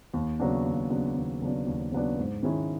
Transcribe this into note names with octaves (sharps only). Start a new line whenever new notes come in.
D#2
C#3 F#3 B3 D4
D#2
C#3 F#3 B3 D4
D#2
C#3 F#3 B3 D4
D#2
C#3 F#3 B3 D4
G#2
D#3 G#3 C#4 E4